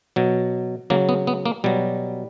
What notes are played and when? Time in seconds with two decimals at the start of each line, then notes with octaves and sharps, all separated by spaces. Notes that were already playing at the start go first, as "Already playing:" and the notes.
0.16 B2 F#3
0.90 C#3 F#3 A#3
1.09 B3
1.27 B3
1.46 A#3
1.64 B2 F#3 G3